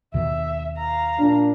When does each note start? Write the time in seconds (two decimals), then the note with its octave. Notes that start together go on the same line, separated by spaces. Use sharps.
0.14 D#2 B2 D#3 E5
0.77 F5 A#5
1.18 A#2 D4